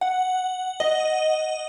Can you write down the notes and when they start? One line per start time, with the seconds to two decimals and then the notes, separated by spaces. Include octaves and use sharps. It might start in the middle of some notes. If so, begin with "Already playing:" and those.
0.01 F#5
0.80 D#5